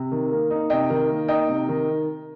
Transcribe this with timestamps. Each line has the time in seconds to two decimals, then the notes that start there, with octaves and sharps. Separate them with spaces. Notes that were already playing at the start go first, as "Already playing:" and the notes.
Already playing: C3
0.11 D#3
0.31 A#3
0.50 D#4
0.70 C3 D#5 G5
0.90 D#3
1.09 A#3
1.28 D#4 D#5 G5
1.48 C3
1.68 D#3